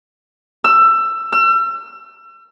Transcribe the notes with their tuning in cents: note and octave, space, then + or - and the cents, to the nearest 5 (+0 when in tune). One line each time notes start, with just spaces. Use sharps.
E6 +20
E6 +40